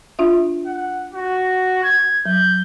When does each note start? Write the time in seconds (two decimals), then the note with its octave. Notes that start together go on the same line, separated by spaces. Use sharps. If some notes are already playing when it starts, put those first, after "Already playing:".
0.19 D4 F4 E5
0.66 F#5
1.13 F#4
1.84 G#6
2.26 F#3 G6